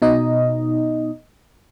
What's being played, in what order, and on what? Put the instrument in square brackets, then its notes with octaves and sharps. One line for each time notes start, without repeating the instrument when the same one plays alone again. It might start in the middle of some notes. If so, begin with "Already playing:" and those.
[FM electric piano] B2 D#4 D#5